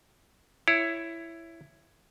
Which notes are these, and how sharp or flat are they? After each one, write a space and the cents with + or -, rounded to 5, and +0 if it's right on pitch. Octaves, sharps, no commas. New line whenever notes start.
E4 +10 C#5 +0